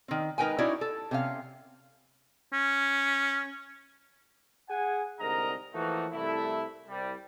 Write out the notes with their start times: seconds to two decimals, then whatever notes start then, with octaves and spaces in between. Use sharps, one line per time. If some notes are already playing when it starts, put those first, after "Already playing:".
0.08 D#3 C4
0.38 G#3 D#4 A#4 B4 G5 G#5
0.58 C#4 D#4 E4 F#4 C#5 D5
0.81 A4
1.11 C3 C#4 F5
2.53 C#4
4.69 G#4 F#5 G#5
5.20 C2 G#2 D3 A#4 D#5 A#5
5.74 E3 F3 A3 A#3 D#4 F#4
6.12 C2 A3 E4
6.89 C2 G3